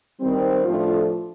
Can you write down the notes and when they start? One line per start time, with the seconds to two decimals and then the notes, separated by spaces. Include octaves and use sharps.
0.20 D#3 G3 C4
0.65 A2 F3 A3 D4 F4